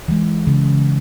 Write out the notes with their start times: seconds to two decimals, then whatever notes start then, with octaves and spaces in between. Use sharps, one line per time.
0.08 E3 G#3
0.47 C#3